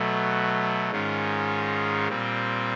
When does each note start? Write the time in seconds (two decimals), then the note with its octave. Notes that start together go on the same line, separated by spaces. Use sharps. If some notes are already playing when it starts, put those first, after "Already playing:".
Already playing: B2 F#3 A3
0.91 G#2 D#3 G#3 C#4 F4
2.08 A#2 G3 C4